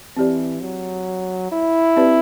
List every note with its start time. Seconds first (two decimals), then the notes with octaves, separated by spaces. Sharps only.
0.17 E3 C4 G4 D5
0.61 F#3
1.52 E4
1.97 C4 G4 B4 D5